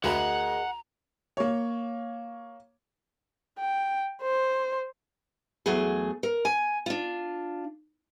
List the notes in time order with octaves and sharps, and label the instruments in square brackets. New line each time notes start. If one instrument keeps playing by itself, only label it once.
[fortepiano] D2 B5 [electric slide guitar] G#4 A#4 D#5 [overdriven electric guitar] F#5 [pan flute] A#5
[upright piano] A#3 C#5
[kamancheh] G5
C5
[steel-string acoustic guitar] E2 F#3 A3 G#4
A#4
G#5
D4 F4